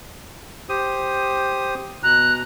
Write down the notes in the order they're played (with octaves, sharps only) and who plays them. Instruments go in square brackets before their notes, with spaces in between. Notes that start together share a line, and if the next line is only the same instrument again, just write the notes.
[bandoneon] G4 C5 D#6
[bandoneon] B2 A#5 [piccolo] F#6